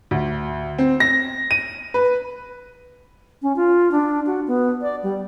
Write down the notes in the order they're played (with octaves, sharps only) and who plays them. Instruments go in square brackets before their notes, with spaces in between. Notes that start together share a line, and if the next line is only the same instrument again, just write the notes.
[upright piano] D2
C4
A#6
D#7
B4
[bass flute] C#4
F4
D4
F#4
B3
D5
G3